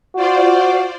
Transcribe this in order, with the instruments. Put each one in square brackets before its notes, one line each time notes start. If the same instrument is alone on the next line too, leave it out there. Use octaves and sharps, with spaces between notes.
[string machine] F4 C5 D5 [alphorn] F#4